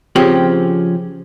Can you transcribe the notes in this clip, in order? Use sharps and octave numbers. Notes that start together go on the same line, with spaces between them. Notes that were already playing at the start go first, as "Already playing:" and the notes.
C#3 F3 C4 C#4 G4